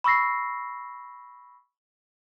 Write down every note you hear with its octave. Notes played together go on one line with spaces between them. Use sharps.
B5 C#6 E6 A#6 C7